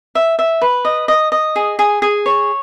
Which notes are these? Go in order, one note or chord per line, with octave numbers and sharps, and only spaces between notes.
E5
E5
B4
D#5
D#5
D#5
G#4
G#4
G#4
C#5